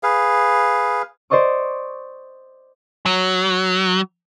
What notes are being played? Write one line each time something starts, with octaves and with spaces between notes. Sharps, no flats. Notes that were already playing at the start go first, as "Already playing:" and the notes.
G#4 B4 F5
C5 D5 D#5 C#6 D6
F#3